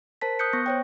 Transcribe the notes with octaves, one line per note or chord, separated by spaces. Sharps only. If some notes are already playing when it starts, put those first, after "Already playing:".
A#4 C5 A5 B6
D#6 F#6 G6 C#7
B3 C#6 A#6
C5 C#5 G5